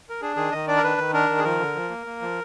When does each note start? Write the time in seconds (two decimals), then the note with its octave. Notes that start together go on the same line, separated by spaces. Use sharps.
0.09 A#4
0.22 D4 G#4
0.37 D#3 G#4
0.52 D#3 D#5
0.68 D4 D5
0.77 A#4
0.83 D#3 B4
0.98 D#3
1.13 D4 A#4
1.30 D#3
1.39 G#4
1.44 F3 A#4
1.59 D3
1.75 F3
1.90 A#3
2.07 A#3
2.21 F3